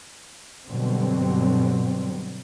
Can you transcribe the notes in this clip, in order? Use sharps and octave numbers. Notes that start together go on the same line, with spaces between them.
G2 B2 D3 F#3 G3 C4